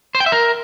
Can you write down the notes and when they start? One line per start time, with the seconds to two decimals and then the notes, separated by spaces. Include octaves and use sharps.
0.15 C5
0.20 G5
0.26 E5
0.32 A#4